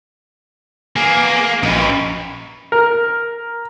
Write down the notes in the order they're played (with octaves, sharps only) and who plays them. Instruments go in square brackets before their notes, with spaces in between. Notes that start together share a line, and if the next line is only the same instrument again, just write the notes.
[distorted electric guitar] A#3 [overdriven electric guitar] B3 G#4
[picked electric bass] A#1 [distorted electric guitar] F#2 [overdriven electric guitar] D#4 B4
[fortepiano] A#4